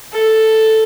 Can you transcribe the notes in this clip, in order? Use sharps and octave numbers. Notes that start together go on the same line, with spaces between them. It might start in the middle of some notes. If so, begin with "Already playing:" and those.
A4